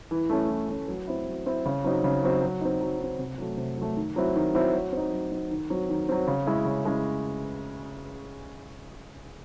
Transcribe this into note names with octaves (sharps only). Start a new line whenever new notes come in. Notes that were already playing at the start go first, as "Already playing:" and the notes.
E3
A3 C#4
E3
A3 C#4
F#3
C4 E4
F#3
C4 E4
C#3
F#3 C4 D#4
C#3
F#3 C4 D#4
F#3
C4 D#4
F#3
C4 D#4
C3
F#3 A3
C3
F#3 A3
D#3
F#3 C4 E4
D#3
F#3 C4 E4
F#3
C4 D#4
F#3
C4 D#4
D#3
F#3 C4
D#3
F#3 C4
C#3
G#3 C#4 E4
C#3
G#3 C#4 E4